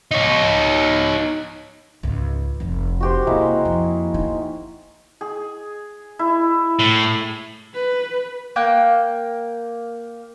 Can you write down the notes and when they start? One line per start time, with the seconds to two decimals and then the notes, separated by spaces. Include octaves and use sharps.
0.11 D#4 C#5
2.03 C#2 G#2
2.60 F1 F2
3.00 F#4 G4 C5
3.27 C3 G#3 A#3 E4
3.65 F2
4.14 D#4
5.21 G#4
6.19 E4
6.79 A2
7.74 B4
8.56 A#3 G5 F#6